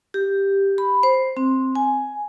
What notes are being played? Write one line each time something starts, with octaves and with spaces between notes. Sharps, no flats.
G4
B5
C5
C4
G#5